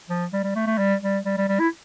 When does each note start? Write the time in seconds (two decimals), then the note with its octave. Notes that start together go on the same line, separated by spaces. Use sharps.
0.09 F3
0.33 G3
0.44 G3
0.55 A3
0.67 A3
0.78 G3
1.02 G3
1.25 G3
1.37 G3
1.49 G3
1.60 E4